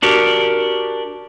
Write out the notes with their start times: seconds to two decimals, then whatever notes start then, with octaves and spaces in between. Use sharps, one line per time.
0.02 D4 F#4 G4 A#4